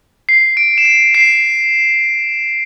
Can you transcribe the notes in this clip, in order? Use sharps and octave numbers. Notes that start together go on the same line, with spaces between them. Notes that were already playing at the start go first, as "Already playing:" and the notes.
C7
D7
E7
D7
C7